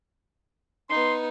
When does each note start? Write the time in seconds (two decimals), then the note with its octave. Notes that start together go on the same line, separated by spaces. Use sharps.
0.90 B3 D#4 C6